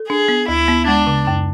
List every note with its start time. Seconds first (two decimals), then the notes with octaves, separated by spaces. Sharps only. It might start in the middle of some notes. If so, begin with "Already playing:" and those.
Already playing: A4
0.09 D4 G#4
0.28 B3
0.48 D2 E4
0.68 B3
0.87 G#3 D4
1.07 C#3
1.27 F#2